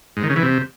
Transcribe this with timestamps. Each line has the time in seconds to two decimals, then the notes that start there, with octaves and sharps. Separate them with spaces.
0.17 G#2
0.23 D#3
0.30 C#3
0.36 E3
0.43 C3